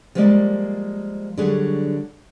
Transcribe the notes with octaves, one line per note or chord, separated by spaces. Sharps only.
F3 G3 G#3 A#3 D5 D#5
D3 F#3 G3 G#4 C#5